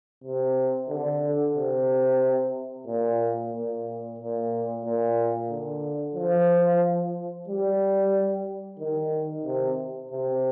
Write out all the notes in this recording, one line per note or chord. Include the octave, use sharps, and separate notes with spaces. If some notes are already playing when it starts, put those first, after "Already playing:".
C3
D3
C3
A#2
A#2
A#2
A#2
D3
F3
G3
D#3
C3
C3